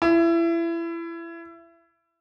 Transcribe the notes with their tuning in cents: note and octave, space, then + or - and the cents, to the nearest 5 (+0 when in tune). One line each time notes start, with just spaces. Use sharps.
E4 +25